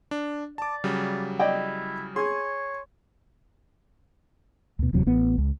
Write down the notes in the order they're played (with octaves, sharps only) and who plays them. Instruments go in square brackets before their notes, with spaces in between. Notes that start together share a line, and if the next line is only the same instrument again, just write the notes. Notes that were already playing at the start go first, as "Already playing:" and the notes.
[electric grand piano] D4
[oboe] D5 [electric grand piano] A5 D6
[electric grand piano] C#3 F#3 G3
[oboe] E4 [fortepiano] D5 D#5 G5
[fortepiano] G#4 [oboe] C#5 [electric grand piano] G#5 C6
[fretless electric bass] D2 B2
D1 E2 C3 F#3
A1 B3
C#2